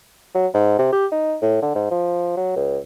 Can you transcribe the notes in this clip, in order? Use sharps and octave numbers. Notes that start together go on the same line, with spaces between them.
F#3
G#2
C3
G4
D#4
A2
D3
G#2
F3
F#3
C#2